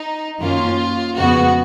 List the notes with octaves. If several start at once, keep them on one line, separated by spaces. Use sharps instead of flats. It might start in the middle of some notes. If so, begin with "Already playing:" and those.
Already playing: D#4
F#2 D#3 A#3 C#4 F4
F2 C#3 G#3 B3 F#4